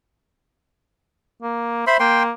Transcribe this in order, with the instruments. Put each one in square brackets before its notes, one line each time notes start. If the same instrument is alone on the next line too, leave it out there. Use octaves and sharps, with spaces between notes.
[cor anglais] A#3
[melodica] C5 B5 C6 [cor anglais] E5
[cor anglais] A#3 [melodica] G5 C6